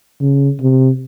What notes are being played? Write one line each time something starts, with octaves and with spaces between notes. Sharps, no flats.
C#3
C3